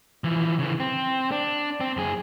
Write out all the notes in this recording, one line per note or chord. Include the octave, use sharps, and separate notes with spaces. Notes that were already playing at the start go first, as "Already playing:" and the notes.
E3 F3
C#3 E3
C4
D4
C4
F#2 G#4